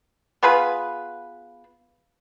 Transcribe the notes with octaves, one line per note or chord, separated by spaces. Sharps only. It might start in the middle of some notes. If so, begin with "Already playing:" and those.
B3 F4 G#4 B4